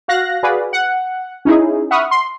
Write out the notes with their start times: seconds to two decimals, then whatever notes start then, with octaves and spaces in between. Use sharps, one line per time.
0.08 F#4 F5 F#6 A#6
0.43 F#4 G#4 B4 D5 F5
0.73 F#5
1.45 C#4 D#4 E4 G#4
1.91 E5 F#5 B5 C#6 D#6 F6
2.11 C6